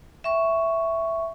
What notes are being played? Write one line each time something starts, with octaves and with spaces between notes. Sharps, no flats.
E5 G5 C#6